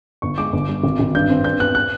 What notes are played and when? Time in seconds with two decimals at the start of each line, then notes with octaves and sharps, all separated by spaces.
0.22 G1 C#6
0.38 G#3 D6
0.53 G1
0.69 G3
0.83 G#1
0.99 G#1
1.15 G2 G6
1.30 C4
1.44 G2 G6
1.60 B3 F#6
1.75 F#6